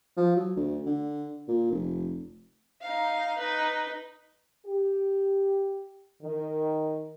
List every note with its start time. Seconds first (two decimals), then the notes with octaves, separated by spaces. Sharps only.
0.17 F3
0.36 F#3
0.56 D2
0.86 D3
1.48 A#2
1.71 F1
2.81 D#4 F5
3.38 D#4 B4
4.65 G4
6.22 D#3